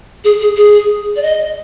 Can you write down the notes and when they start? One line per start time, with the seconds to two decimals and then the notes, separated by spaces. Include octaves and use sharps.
0.24 G#4
0.41 G#4
0.57 G#4
1.16 D5
1.23 D#5